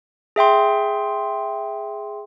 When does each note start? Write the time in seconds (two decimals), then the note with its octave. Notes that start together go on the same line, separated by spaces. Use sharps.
0.36 G#4 E5 G5 C6